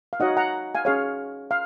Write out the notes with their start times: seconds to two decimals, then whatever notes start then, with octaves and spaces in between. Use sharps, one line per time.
0.13 F5
0.20 D#4 F#4 C#5 D#5 F#5
0.37 F#5 A#5
0.75 F5 G#5
0.85 C#4 G#4 C#5 F5
1.51 F5